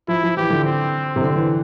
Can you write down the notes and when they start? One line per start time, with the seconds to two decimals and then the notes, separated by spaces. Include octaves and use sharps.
0.08 F3 E4
0.23 F3
0.37 E3 G4
0.50 D3
0.65 C4
1.16 C3
1.21 D3
1.35 E3